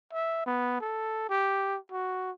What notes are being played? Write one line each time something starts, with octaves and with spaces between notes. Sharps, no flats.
E5
B3
A4
G4
F#4